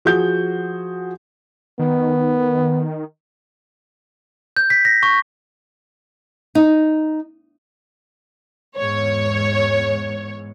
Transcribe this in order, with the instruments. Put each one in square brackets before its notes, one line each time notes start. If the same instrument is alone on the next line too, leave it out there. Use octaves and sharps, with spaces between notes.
[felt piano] F3 F#4 G#4 G6
[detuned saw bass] D#3 [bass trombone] B3
[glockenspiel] G6
B6
A#6
C#6
[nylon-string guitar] D#4
[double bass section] E2 G#2 [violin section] C#5